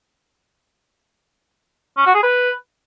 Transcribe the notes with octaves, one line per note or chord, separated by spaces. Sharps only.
C#4
F#4
G#4
B4